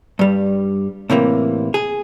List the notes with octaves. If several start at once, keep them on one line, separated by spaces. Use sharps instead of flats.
G2 G3
A2 C3 E3 A#3
G#4